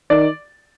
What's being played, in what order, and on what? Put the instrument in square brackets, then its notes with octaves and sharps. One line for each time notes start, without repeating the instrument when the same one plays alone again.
[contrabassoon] D#3 [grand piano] D5